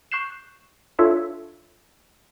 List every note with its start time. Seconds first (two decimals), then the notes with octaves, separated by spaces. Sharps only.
0.12 C#6 F#6 G6 C7 E7
0.99 D4 F4 A4 C#5 E5 A5